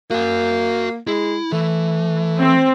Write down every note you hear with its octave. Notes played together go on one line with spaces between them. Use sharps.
A#3 F#4 G#5
G#3 E4
E3 A3
C4